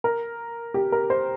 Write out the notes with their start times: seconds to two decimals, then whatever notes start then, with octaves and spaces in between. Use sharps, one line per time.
0.04 A#4
0.74 G4
0.92 A#4
1.10 C5